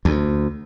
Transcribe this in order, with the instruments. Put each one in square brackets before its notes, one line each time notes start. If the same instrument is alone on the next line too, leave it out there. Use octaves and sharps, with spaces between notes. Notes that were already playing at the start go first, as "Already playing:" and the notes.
[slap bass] D2